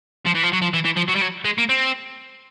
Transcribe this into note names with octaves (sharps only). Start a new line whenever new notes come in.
F3
E3
F3
F#3
F3
E3
E3
F3
F#3
G3
F#3
G#3
A#3
C4